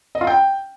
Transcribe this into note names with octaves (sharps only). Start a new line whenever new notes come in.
D#5
F4
G5